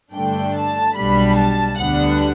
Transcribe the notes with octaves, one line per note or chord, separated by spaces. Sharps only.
G2 D3 A3 D4 G5
A5
B1 B2 G3 D4 B5
A5
D2 D3 G3 B3 D4 F#5